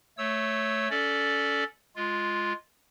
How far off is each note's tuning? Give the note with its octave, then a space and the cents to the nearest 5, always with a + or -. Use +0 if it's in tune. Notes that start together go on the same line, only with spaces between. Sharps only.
A3 +0 C#5 +0 E6 -20
C#4 +25 A4 +0 D5 +0
G#3 +0 F4 +0